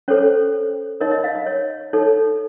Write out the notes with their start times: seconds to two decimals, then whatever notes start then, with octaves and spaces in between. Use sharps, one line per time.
0.08 C#4 A4 C5 C#5
1.00 D#4 A#4 C#5 D#5
1.12 D#5
1.24 F5
1.35 D#5
1.46 C#5
1.93 D#4 A4 C#5